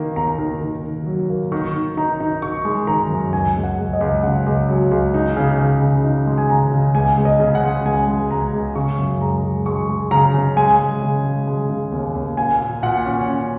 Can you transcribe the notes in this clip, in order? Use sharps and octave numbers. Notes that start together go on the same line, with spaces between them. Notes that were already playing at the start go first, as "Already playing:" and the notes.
Already playing: D#3 A#3
D#2 A#5
D#3
D#3
D#3
F#3
A#3
D#3 C#6
D#3
D#4 A#5
D#4
D#4 C#6
G#3
D#3 A#5
F#2
C#2 G#5
C#2
F#5
C#2
D#5
C#2
C#3 F#5
C#2
F#3
C#2
D#4
C#3
C#3
C#3
D#4
G#3
G#5
C#3 A#5
C#3
C#2 G#5
C#2
D#5
C#3
F#5
G#3
C#2 G#5
G#3
C#2 A#5
C#2
C#3 C#6
F#2
G#3 A#5
G#3
G#3 C#6
G#3
C#3 A#5
C#3
G#3 G#5
G#3
C#3
G#3
G#3
C#3
D#2
D#2
A#2 G#5
A#2
A#2 F#5
C#4
C#4